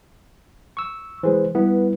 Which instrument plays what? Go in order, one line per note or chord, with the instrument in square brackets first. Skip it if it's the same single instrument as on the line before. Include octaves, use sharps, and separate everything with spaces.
[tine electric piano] C#6 E6
[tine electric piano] E3 [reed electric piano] G#3 G#4 C5
[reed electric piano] G3 E4 B4 [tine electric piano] B3